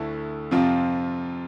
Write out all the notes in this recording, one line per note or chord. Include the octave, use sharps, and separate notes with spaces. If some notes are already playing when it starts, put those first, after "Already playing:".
Already playing: D2 D3 A3 E4
F2 C3 F3 C4 F4